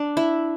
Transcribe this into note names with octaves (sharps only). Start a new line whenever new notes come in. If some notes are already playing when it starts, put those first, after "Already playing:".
Already playing: D4
E4